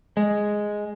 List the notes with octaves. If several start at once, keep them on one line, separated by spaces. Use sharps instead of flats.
G#3